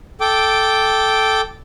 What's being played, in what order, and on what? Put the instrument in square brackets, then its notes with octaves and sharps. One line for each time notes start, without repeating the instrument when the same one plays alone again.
[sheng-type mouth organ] A4 G5 D6